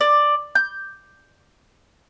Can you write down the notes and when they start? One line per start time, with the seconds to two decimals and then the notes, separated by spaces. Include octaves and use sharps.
0.01 D5
0.55 G6